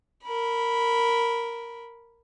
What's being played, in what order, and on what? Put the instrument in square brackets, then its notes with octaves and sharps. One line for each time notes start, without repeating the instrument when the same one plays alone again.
[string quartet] A#4 B5